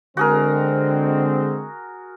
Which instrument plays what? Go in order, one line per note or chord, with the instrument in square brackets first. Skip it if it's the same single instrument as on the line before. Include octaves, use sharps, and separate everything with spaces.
[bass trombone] D3 [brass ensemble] G#3 C4 [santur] F#4 G#4 A#4